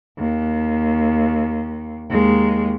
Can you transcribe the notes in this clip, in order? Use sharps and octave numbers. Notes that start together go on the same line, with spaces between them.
D#2
D#2 G#3